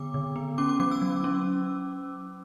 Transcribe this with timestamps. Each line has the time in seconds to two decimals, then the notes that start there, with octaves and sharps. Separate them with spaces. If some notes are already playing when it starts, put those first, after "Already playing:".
Already playing: D3 B3 D6
0.14 D3
0.36 B3
0.58 C#4 D6
0.69 D6
0.80 F#3 D6
0.91 E6
1.02 F#3
1.24 C#4